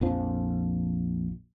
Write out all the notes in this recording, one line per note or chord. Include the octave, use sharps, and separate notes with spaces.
A#1 F2 F3